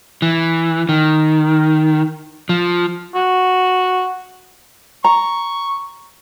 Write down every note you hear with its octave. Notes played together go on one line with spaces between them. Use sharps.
E3
D#3
F3
F#4
A#5 C#6